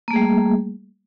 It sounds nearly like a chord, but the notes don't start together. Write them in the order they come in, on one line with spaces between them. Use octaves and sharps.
A#3 A3 G#4 G3